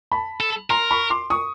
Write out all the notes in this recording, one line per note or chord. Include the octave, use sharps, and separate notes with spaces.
A5 B5
A4
A#4 A#5 C6
B5 C#6
C6 D6
C#6 D#6